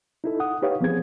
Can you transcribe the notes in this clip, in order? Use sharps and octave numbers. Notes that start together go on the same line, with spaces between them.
D#4 E4 A4
F#5 D#6
D#4 G4 B4 C#5 F5
F3 B3 C4 G#4 G#6